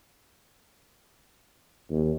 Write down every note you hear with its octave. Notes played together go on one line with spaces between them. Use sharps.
D#2